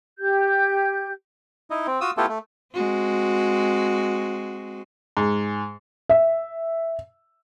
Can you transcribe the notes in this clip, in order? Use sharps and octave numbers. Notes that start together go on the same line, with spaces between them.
G4 G6
D#4 E4 D#5
C4
F4 F#4 D#6 E6
A3 B3 E4 F4 G4 A4
A3
G#3 C4 F#4
G#2
E5